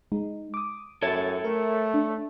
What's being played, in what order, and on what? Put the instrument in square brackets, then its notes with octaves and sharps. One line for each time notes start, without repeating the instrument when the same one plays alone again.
[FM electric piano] G#3 D#4
D6 D#6
[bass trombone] F#2 [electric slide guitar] A4 C#5 E5 [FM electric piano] G#6 A6
[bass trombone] A3 [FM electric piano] A#4
[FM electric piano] D4